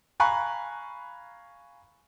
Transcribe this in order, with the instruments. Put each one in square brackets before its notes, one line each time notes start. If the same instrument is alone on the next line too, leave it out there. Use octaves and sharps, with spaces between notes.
[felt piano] F5 G#5 A#5 B5 C#6 F#6